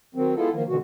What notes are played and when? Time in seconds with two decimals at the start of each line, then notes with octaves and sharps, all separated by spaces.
0.15 D#3 F#3 C4
0.35 G#3 B3 E4 F4 A4
0.53 D#3 F3 A#3
0.68 B2 D3 E3 G#3 F#4